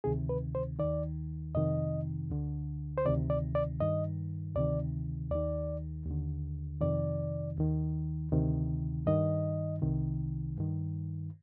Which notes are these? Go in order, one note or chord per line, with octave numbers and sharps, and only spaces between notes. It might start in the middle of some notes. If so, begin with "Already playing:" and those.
D2 C3 D#3 G#4
B4
C5
D#2 D#3 D5
F2 C3 D#3 D#5
D2 D3
C5
D2 C3 D#3 D5
D5
D5
G2 D#3 D#5
D2 C3 D#3 D5
D#2 D#3 D5
D#2 D3
F2 C3 D#3 D5
D#2 D#3
D2 C3 D#3
G2 D#3 D#5
C2 C3 D#3
G2 D#3